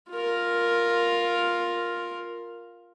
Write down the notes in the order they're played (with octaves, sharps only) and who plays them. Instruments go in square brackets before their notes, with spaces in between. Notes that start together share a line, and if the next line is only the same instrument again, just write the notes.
[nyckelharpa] F4 A#4